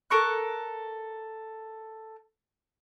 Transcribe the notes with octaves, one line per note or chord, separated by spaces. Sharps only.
A4 A#4 C#6 F#6